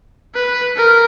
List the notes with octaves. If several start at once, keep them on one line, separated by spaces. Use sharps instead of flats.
B4
A#4